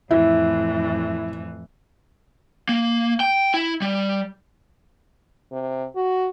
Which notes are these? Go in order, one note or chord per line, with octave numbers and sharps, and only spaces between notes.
F2 A2 E3 E4
A#3
G5
E4
G3
C3
F#4